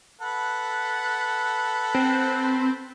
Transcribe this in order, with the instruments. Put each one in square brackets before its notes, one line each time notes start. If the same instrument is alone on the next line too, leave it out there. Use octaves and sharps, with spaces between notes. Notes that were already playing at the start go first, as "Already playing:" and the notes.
[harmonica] A4 B4 F#5
[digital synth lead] C4